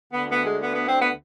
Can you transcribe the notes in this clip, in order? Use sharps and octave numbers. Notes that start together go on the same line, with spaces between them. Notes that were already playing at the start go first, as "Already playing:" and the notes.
D2 D3 B3
B3
G#3
B3
B3
C4
B3